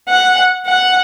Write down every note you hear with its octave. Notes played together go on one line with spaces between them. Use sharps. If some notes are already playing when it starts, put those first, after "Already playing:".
F#5
F#5